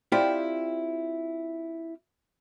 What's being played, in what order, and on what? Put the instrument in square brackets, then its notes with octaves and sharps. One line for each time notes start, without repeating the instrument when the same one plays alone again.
[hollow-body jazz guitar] C4 E4 F4 G4 D5